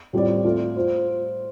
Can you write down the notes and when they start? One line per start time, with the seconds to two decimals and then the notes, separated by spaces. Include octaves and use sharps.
0.13 A2 G3 C4 F4 D5
0.45 A3 F4 A4
0.76 F4 C5